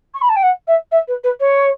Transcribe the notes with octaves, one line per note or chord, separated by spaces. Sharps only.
C#6
B5
A5
G5
F#5
E5
E5
B4
B4
C#5